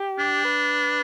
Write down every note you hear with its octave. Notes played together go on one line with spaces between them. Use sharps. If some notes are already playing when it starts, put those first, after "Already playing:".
Already playing: G4
D4
B4